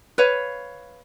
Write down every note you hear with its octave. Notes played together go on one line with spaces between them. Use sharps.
B4 C#5 F5